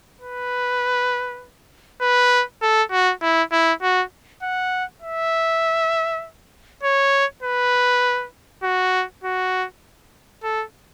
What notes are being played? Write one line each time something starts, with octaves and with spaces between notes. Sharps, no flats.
B4
B4
A4
F#4
E4
E4
F#4
F#5
E5
C#5
B4
F#4
F#4
A4